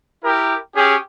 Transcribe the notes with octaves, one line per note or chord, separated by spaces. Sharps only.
E4 G4 A#4
C#4 G4 G#4